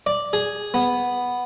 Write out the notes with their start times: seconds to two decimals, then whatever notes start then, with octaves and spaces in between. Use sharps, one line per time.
0.06 D5
0.33 G#4
0.74 B3